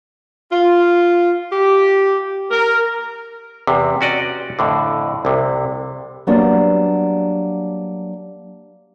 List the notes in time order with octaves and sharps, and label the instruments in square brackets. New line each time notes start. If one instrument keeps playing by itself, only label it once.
[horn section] F4
G4
A#4
[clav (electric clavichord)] E2 C3
C#4 F#4 D5 D#5
F2 A2 D3
C2 C3
[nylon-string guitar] F#3 G3 A#3 B3 D4